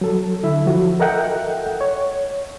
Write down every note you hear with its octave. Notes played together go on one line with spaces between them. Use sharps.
F#3 A4
D3 E4 E5
F3 F#4
A4 A#4 D#5 E5 F#5 G5
C#5